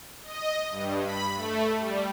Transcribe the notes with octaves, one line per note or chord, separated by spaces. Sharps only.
D#5
G2
B5
A3
G3